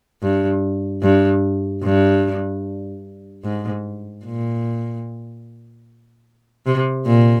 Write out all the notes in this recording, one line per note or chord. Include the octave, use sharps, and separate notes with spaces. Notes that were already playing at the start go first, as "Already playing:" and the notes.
G2
G2
G2
G#2
A#2
C3
A#2